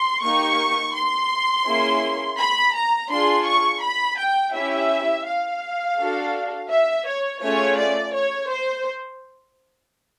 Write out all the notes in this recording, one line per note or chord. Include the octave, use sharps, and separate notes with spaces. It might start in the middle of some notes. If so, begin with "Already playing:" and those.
Already playing: C6
A#3 D#4 G4 C#6
C6
A#3 C#4 E4 G#4
B5
A#5
D4 F4 G#4 C6
C#6
B5
G5
C#4 E4 G4 E5
F5
D4 F#4 A4
E5
C#5
A3 C#4 F4 G#4 C#5
D5
C#5
C5